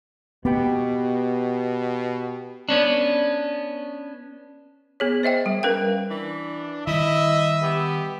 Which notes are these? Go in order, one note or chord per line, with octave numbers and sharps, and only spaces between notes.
B2 B3 G4 B4 G5
B3 C#4 D4
B3 G#4 C#5
C5 D#5 E5 G5
G3
C#4 A#4 B4 F5 G5
E3 D4
D#3 G3 E4 D#5 E5
B3 G4